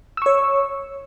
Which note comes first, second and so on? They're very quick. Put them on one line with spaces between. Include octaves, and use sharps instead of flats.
E6 C#6 C#5